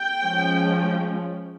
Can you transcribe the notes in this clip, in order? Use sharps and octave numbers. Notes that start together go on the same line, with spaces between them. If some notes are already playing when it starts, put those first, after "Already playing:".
Already playing: G5
F3 G#3 C#4